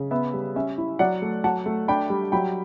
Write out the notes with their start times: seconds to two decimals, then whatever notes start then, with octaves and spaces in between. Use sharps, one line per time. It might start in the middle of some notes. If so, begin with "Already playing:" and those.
Already playing: C#3
0.11 B3 E5
0.34 G3
0.56 C#4 E5
0.78 E4
0.99 F#3 D5 F#5
1.22 A3
1.44 F#3 F#5 A5
1.66 A3
1.88 D4 G5 B5
2.10 G3
2.32 F#3 G5 B5